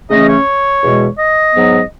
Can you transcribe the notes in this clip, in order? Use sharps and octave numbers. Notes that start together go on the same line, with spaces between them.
C#3 E3 A3 C#4 D#5
C#5
E2 B2 G#3
D#5
G#2 F#3 B3